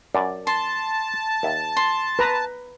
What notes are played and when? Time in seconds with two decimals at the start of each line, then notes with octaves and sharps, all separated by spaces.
0.15 F#2 D5
0.47 A5 C6
1.43 D#2 E5
1.77 C6
2.19 B4 A#5